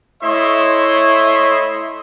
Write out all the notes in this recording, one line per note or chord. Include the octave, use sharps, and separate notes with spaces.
A3 E4 C#5 D#5 E5 C6